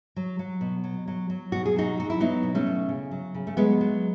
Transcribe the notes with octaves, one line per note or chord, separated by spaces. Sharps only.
F#3
F#3
B2
F#3
F#3
F#3
B2 F#4
G#4
F#3 D#4 F#4
F#3 F#4
E4
F#3 B3 D#4
B2
A3 C#4
B2
C#3
F#3
C#3
A3
F#3 G#3 B3
F#3